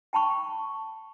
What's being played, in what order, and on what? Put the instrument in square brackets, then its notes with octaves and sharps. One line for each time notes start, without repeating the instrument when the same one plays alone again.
[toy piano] G5 A5 B5 C#6